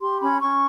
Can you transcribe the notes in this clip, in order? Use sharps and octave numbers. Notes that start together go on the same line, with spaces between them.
G4 C6
C#4 B5
C#4 C#6